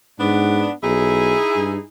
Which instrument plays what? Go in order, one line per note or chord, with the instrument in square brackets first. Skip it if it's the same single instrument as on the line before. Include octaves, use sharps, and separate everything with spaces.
[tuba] G#2 [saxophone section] B3 D4
[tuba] B1 [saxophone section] D#4 E4 G#4
[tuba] G2